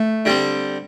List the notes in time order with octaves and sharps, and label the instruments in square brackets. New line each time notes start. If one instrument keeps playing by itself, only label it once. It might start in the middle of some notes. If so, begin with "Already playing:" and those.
Already playing: [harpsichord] A3
D3 G3 C4